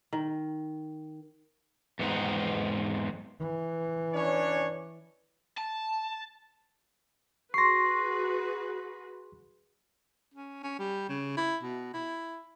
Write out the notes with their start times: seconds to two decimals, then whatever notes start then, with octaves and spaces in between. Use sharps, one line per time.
0.13 D#3
1.99 E2 G#2 B3 C4 D#4
3.40 E3
4.14 C#4 D4 C#5
5.58 A5
7.54 F#4 G#4 B4 C6 C#6 A#6 C7
10.34 C#4
10.63 C#4
10.79 G3
11.09 C#3
11.37 E4
11.63 B2
11.94 E4